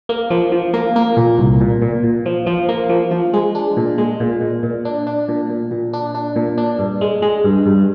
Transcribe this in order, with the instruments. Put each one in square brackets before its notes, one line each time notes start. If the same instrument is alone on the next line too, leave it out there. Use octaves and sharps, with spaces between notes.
[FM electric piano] A#3
F3
F3
A#3
A#3
A#2
C2
A#2
A#2
A#2
F3
F3
A#3
F3
F3
G#3
D4
A#2
G#3
A#2
A#2
A#2
D4
D4
A#2
A#2
A#2
D4
D4
A#2
D4
G2
G#3
G#3
G2
G2